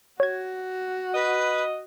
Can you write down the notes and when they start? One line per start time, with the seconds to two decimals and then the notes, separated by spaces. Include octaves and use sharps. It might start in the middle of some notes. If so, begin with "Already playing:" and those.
0.20 F#4 C#5 G#6
1.14 B4 D#5